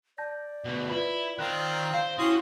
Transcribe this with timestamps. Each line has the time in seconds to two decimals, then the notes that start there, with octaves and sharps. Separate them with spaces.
0.18 D5 A5 G6 A#6
0.65 D2 B2
0.90 E4 F4 B4 B5
1.39 D#3 C4 F4 G5 F#6
1.94 C5 F5
2.18 C#4 E4 F#4 G4 C6 D#6